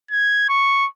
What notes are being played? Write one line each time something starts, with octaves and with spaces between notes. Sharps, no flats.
G#6
C#6